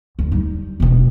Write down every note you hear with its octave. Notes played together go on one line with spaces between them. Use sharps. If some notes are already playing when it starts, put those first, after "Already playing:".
D2
G3 D#4
D#1 B2